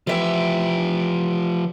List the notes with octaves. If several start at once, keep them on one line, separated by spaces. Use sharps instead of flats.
E3 F3 G4 E5